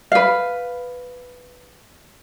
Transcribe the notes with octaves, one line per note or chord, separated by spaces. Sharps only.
B4 F5